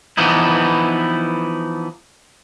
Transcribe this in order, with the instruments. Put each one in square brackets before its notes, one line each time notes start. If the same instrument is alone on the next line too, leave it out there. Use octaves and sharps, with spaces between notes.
[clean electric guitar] E3 F3 B3 D#4 E4